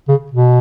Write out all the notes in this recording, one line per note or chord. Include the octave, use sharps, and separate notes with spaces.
C#3
B2